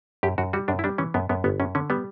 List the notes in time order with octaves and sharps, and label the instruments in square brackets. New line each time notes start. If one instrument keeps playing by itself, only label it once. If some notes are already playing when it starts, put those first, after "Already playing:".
[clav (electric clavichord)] F#2 G4
F#2 F#4
G3 F#4
F#2 D4
E4
G3 D4
E3 C#4
F#2 B3
F#2 B3
G1 B3
F#2 C#4
D3 C#4
G3 B3